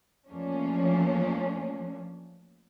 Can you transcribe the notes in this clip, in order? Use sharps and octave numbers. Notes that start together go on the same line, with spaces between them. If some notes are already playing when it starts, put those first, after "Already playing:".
E2 F3 A3 A#3 C#4 D4